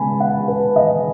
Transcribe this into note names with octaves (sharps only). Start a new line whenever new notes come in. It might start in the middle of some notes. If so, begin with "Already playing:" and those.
Already playing: C#3 G#3 B3 G#5 A5 B5
F#5
B4
D#5